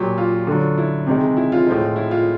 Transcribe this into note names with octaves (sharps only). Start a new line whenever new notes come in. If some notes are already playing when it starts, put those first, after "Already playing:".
Already playing: A#2 F#3 G4
F4
D3 F#3
E4
C3 D#3 G#3
E4
F4
A2 F3 G#3
E4
F4